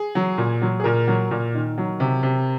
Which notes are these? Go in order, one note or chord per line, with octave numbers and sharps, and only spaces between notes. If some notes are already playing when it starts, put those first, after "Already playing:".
Already playing: G#4
F#3
A#2
F#3
G#4
A#2 A#4
F#3
A#2
D#3
F#3
C3
C3